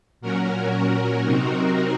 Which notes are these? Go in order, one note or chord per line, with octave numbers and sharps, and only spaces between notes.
A#2 F#3 C#4 F#4 A#4
F#4 A#4
C3 F#3 C4 D#4 F#4 A#4